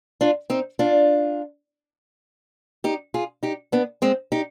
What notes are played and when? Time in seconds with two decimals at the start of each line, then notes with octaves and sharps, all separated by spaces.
0.21 D4 F4
0.50 C4 D#4
0.79 D4 F4
2.84 D#4 G4
3.14 F4 G#4
3.43 D#4 G4
3.72 B3 D4
4.02 G#3 C4
4.32 D#4 G4